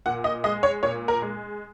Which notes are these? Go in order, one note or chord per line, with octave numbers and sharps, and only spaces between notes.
A#2 F#5
D#5
G#3 D#5
C#5
A#2 C#5
A#4
G#3